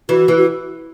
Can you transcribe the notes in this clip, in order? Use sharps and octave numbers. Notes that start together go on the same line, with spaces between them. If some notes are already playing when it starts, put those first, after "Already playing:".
E3 F#4
E3
F#4